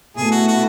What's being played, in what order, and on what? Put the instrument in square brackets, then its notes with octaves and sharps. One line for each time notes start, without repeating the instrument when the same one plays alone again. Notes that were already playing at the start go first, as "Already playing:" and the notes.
[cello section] B2 A3 E4 A4 [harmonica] G#4
[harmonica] F#4
F#4